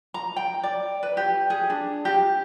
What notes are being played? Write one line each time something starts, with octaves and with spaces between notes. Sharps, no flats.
A#5
G5
D5
B4
G4
G#4
D4
G4